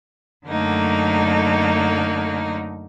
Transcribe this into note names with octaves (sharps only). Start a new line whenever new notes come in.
F#2 D3 F#3 A3 A#3 D#4